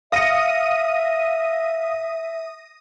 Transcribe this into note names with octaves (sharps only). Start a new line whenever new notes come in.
E5 F5 D#6 A#6 C#7 D#7